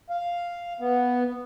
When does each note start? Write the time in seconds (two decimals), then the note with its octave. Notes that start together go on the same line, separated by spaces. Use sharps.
0.10 F5
0.80 B3